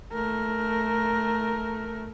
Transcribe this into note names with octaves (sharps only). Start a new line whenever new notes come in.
A3 A#4